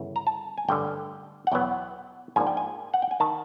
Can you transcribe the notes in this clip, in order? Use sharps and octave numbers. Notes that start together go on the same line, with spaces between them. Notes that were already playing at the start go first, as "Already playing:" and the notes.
Already playing: G1 C#3 E3
A#5
A5
G#5
A1 G2 D3 G5
F#5
E2 B2 F#3 B3 G5
G#2 F3 A#3 D4 G#5
G5
G#5
F#5
G5
G#5
D#3 A5